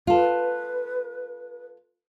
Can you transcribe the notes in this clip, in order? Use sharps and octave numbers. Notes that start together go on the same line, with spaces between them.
F4 A4 B4